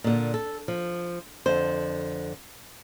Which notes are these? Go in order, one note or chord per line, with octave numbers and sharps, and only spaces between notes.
A#2 D3
A4
F3
F2 D3 C5